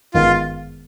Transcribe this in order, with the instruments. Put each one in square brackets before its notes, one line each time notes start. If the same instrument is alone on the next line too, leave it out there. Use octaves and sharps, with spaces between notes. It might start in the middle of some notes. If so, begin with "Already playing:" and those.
[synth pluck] G1 F#2 D#3 G#3 B3 [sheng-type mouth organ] F4